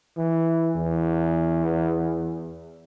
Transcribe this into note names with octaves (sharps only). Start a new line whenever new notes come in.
E3
E2